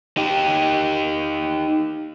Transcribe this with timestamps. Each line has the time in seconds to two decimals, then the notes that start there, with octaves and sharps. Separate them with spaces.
0.17 D#4 G4